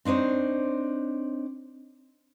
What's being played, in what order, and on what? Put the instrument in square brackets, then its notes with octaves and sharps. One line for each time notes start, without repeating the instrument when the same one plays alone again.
[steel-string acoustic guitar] C4 D4 D#4 C5 C#5